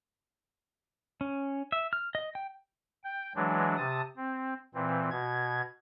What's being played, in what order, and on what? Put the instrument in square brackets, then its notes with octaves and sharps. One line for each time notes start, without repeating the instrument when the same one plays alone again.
[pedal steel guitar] C#4
E5
F6
D#5
G5
[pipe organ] G5
E3 F#3 G#3 D4
C3 A5 D#6
C4
A#2 E3 C4
B2 G#6